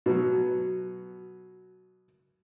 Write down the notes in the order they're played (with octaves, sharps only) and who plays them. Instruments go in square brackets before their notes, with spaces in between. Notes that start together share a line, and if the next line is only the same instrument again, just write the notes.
[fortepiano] B2 F#3